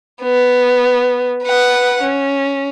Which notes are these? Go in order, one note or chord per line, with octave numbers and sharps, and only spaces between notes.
B3
B4 F#5
C#4